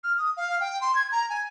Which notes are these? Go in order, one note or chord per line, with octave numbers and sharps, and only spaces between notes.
F6
D#6
F5
G5
C6
G#6
A#5
G#5